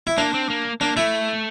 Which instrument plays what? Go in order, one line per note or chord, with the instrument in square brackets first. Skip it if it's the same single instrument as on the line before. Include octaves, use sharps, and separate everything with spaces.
[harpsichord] E4
[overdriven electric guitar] A#3 [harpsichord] D4
[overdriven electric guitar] C4
A#3
[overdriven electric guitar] A#3 [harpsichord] D4
[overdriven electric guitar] A3 [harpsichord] E4